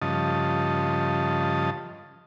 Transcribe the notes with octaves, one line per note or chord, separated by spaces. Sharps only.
G2 C#3 F3 D#5 A5